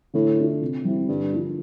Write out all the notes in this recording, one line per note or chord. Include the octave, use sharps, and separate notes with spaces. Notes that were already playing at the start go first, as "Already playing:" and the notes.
A2 D3
A3 D4 F4
C3
G3 C4 E4
G2 D3
F3 A#3 D4 F4